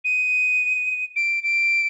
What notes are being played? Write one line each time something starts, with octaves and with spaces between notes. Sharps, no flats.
D#7
D7
D7